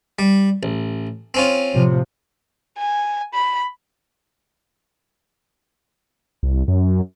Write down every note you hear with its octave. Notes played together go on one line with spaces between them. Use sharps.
G3
A1
C4 C#4 F4
A2 C3 F3
G#5
B5
C2
F#2